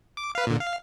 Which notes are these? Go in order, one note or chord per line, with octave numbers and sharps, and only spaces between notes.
D6
B4 F5
A#2 D3
F5